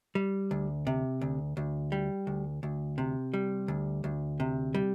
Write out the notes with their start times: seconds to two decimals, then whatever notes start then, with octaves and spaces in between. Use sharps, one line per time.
0.15 G3
0.51 D2
0.87 C3
1.21 D2
1.57 D2
1.92 G3
2.27 D2
2.63 D2
2.98 C3
3.34 G3
3.68 D2
4.04 D2
4.40 C3
4.75 G3